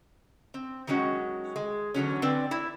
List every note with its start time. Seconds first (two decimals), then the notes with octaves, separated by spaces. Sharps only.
0.54 C4
0.87 D#3 F#3 G#3 C#4 F#4
1.56 G#3
1.94 E2 D3 F#3 C#4
2.22 D3 C4 D4 B4 D5
2.51 E4